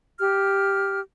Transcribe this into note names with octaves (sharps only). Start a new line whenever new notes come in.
G4 F6